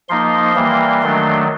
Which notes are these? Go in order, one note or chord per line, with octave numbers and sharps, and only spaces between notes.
F3 A#3 D#4 C6
E3 G3 A#3
D#3 F#3 A3 D4